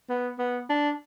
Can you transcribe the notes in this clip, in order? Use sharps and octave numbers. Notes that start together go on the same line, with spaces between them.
B3
B3
D4